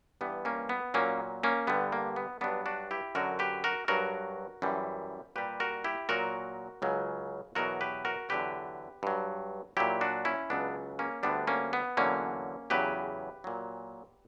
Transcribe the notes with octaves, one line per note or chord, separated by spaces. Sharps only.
G2 E3 G3 B3
A#3 C#4
B3
A#2 F#3 A#3 C#4
A#3 C#4
G2 D3 G3 B3
A#3
B3
G2 F#3 B3 D4
D4 F#4
E4 G4
F#2 D3 F#3 F#4 A#4
G4 B4
F#4 A#4
G2 F#3 F#4 A#4
F#2 E3 G3
A#2 G3 G4 B4
F#4 A#4
E4 G4
A#2 F#3 F#4 A#4
C#2 C#3 F#3
E2 B2 F#3 F#4 A#4
G4 B4
F#4 A#4
E2 D3 F#3 G4 B4
G2 F#3
A#2 F#3 E4 G4
D4 F#4
C#4 E4
C#2 C#3 F#3 B3 D4
A#3 C#4
D2 D3 G3 B3 D4
A#3 C#4
B3
E2 D3 F#3 A#3 C#4
E2 C#3 F#3 G4 B4
A#2 F#3